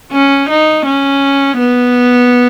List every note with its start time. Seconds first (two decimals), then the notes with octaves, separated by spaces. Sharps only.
0.11 C#4
0.49 D#4
0.85 C#4
1.59 B3